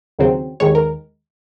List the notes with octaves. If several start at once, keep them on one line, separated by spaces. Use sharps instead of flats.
D#2 C#3 F#3 C4
D#2 D#3 G#3 C#5
A#4